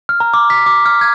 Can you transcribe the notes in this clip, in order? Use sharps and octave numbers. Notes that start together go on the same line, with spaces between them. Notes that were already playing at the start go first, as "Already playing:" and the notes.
F6
A#5
D6
B6
D6
F6
G#6